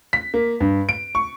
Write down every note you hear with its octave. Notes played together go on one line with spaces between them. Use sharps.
B6
A#3
G2
D7
C#6